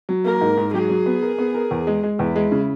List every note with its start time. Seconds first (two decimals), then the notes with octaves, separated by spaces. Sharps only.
0.09 F#3
0.24 A#3 A#4
0.41 G#2
0.57 G#2
0.74 F#3 G#4
0.90 F#3
1.06 B3
1.22 A#4
1.38 B3
1.55 A#4
1.71 E2
1.87 G#3
2.03 G#3
2.19 E2 E4
2.36 G#3
2.52 C#3